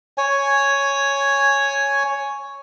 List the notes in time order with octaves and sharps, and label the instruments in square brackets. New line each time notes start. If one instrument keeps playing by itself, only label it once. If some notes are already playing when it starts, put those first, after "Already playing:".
[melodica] C#5 G#5